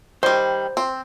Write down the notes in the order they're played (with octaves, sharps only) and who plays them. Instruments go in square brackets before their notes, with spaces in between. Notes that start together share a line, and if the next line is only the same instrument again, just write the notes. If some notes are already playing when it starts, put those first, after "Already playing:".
[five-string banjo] D#3 G3 [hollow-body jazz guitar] C5
[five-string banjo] C4